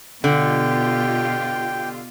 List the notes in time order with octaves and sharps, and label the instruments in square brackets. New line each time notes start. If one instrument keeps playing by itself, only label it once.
[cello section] B2 F4 G4 [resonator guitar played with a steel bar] D3 [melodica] G5